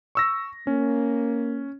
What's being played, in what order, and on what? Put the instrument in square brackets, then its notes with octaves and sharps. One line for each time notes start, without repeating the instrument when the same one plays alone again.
[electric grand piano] C#6 E6 A#6
[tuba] A#3 [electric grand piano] C#4